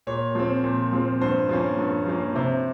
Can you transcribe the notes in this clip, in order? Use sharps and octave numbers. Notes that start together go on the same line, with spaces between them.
A#2 C#5
F3 C4
A#2
F3 C4
G2 C5
F3 A#3 C#4
G2
F3 A#3 C#4
C3 C5